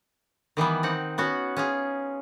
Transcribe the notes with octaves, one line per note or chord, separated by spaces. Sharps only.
D#3 E3 G3 B3
C4 D#4 F#5
B3 C#4 F#4
C#4 F4 G#4